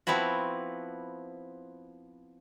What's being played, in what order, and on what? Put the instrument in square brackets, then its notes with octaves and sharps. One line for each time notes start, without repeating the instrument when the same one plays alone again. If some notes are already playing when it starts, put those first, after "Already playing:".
[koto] F3 B3 C4 E4 F#4